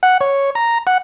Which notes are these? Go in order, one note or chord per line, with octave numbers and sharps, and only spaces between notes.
F#5
C#5
A#5
F#5